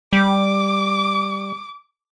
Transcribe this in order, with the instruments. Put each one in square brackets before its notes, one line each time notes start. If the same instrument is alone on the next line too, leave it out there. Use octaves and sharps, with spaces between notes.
[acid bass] G3 [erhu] D6